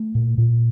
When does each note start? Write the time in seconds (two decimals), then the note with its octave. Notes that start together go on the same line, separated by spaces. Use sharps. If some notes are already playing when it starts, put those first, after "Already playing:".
Already playing: A3
0.15 A#2
0.38 A#2